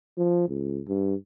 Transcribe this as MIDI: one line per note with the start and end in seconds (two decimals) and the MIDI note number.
0.18 0.45 53
0.48 0.82 37
0.88 1.15 43